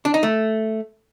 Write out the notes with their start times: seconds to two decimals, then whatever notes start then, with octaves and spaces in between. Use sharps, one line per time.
0.05 D4
0.14 D#4
0.23 A3